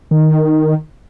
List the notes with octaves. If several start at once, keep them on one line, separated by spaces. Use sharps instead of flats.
D#3